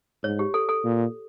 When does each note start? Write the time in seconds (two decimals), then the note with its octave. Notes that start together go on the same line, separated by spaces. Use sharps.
0.23 G#2 C#5
0.39 G4
0.54 A4
0.69 A4
0.84 A#2